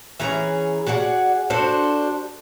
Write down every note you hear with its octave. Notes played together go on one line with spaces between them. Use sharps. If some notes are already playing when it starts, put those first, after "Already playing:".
E3 C#4 G#4 A#5
F#4 G#4 D5 F#5
D4 F#4 A4 C5